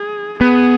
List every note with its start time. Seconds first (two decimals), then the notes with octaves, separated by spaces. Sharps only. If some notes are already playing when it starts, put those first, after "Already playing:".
Already playing: G#4
0.40 B3 G#4